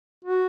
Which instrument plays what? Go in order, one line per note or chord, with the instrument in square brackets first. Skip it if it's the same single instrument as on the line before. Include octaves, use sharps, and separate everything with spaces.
[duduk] F#4